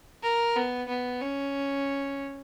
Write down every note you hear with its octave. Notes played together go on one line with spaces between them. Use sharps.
A#4
B3
B3
C#4